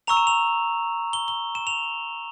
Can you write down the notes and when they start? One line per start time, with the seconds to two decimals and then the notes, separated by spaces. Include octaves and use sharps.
0.07 A#5 C#6 E6 F7
0.17 E7
0.27 F7
1.13 G7
1.28 G7
1.55 E7
1.67 F7